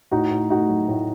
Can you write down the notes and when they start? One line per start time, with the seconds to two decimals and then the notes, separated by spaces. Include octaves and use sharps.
0.11 A2 D#4 F#4
0.31 A2
0.50 A3 D#4 F#4
0.69 F#3
0.88 A2